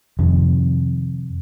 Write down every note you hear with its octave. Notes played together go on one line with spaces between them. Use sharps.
F2 C3 D#3